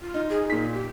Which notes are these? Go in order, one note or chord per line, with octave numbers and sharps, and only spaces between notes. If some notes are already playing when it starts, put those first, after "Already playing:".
F4
D#4
G#4
A#2 D#4 B6
G4